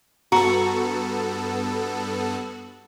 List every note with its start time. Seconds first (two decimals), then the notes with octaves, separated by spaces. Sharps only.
0.32 G2 B3 F#4 A4 A#5